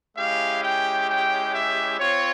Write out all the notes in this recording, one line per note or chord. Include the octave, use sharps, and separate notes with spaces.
G#3 C#4 E4 G4 F5
G5
G5
E5
C4 F4 C#5